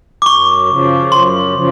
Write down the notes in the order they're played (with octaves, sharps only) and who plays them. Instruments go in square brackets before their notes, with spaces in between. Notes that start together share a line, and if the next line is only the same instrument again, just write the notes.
[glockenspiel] D6
[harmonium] F#2 [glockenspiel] C#6
[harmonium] C#3 F3
[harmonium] F#2 [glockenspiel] C6
[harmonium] C#3 F3